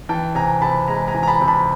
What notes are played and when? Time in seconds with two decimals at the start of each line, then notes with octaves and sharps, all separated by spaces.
0.09 E3 G5 A5
0.35 C3 G#5 A#5
0.62 C3 A5 B5
0.88 G#3 G#5 A#5
1.08 G#5 A#5
1.14 E3
1.23 A#5
1.28 A5 B5
1.41 C3
1.48 A5 B5